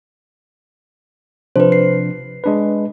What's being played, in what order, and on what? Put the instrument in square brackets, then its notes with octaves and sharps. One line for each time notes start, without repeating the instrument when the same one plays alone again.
[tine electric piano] C3 F3 D4 [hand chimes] B4 C5
[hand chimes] C7
[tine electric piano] G#3 D4 B4